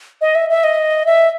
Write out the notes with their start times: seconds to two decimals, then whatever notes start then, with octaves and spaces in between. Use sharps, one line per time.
0.21 D#5
0.35 E5
0.50 E5
0.64 D#5
1.06 E5